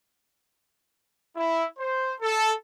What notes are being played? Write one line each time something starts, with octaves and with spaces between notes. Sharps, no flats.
E4
C5
A4